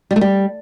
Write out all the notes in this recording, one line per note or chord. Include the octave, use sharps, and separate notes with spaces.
G3
A3
G3